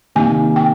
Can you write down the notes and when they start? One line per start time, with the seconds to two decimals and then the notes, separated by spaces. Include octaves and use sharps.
0.15 C3 D#3 A#3 G#5
0.56 G5